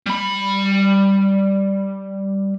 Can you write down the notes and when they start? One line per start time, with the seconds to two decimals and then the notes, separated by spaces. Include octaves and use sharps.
0.06 G3 B5